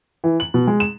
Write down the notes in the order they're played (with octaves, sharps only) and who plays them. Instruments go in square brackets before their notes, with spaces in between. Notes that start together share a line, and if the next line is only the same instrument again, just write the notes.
[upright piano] E3
F#7
B2
G#3
E7